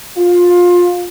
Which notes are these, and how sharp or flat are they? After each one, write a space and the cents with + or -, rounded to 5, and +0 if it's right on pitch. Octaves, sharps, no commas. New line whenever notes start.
F4 +20